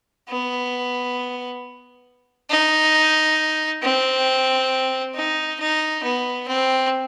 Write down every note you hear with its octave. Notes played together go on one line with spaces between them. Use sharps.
B3
D#4
C4
D#4
D#4
B3
C4